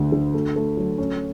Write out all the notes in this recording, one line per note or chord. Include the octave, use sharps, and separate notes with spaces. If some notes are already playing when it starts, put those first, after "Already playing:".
Already playing: D2 D3
D3
A3
A3
F#3
C#4